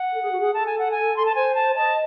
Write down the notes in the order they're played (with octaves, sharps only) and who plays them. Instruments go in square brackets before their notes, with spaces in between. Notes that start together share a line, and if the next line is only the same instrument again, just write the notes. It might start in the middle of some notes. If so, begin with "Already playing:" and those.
Already playing: [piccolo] F#5
[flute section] A4
G#4
F#4
G#4
[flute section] A4 [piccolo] A5
[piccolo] G#5
F#5
G#5
C6
A5
[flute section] C5 [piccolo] G#5
[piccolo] A5
[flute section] D#5 [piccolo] A5